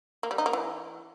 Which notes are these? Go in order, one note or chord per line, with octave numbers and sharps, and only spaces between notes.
A#3
G3
D#4
A#3
E3